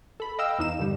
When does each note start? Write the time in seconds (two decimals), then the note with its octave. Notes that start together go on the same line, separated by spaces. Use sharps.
0.20 A4 B5
0.39 D#5 F5 G5 E6
0.59 E2 D#4 E7
0.79 G2 D3 G3